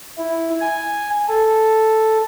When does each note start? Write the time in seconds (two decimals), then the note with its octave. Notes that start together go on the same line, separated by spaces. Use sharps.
0.18 E4
0.60 G#5
1.28 A4